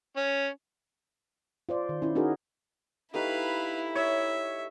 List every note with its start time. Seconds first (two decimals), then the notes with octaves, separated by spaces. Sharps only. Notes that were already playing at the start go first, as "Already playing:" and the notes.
0.17 C#4
1.69 F4 C5 D5
1.89 D#3
2.02 C#4 E4
2.15 C#4 D#4 F#4 G#4 A#4
3.14 A3 D#4 E4 G4 B4 F5
3.95 C#5 E5